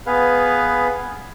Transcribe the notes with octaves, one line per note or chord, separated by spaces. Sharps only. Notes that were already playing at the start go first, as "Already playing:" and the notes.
B3 G#4 B4 F5